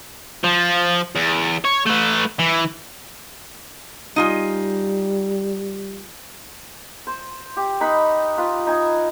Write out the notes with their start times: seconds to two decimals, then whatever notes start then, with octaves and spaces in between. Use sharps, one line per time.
0.44 F3
1.16 E2
1.65 C#5
1.86 A3 B4
2.39 E3
4.16 G3 D#4 F4 G#5
7.07 C5
7.57 G4
7.81 D#4 B4 B5
8.37 F4 B4
8.67 D#4 G#5